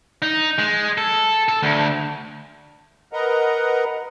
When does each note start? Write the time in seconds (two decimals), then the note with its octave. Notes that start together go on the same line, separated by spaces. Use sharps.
0.22 D#4
0.58 G#3
0.98 A4
1.48 A4
1.62 D2
3.13 A#4 B4 D#5 F#5 A#5